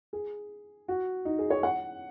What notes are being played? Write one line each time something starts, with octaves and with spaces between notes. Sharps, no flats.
G#4
F#4
D#4
G#4
C#5
F#5